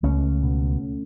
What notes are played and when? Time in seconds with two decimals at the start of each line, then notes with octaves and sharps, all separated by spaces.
0.03 C#2 A3 C#4
0.43 B2